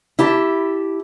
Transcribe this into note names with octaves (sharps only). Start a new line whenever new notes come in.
E4 G4 A5